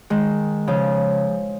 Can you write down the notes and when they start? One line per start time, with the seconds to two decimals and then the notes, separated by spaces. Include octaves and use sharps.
0.10 D#3 G#3
0.67 C#3 F3